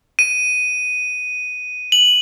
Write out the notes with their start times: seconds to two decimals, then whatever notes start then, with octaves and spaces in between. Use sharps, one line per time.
0.19 D#7
1.92 F#7